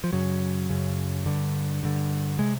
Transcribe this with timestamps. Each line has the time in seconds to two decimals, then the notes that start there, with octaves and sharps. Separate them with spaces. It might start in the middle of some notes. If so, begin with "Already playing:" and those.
0.04 F3
0.13 F#2 C#3 F#3
0.69 F#2 C#3
1.26 G2 D3
1.83 G2 D3
2.39 C3 G#3